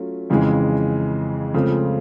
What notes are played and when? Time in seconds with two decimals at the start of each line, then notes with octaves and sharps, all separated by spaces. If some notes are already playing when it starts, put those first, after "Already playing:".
Already playing: F#3 A3 C#4 F4
0.30 F2 C#3 E3 G#3
1.54 C#2 C#3 F3 A3 C4